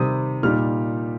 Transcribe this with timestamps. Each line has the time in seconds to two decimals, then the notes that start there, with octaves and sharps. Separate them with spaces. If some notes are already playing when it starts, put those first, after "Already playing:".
Already playing: C3 D#3 G3 D#6
0.43 A#2 G3 D#4 F6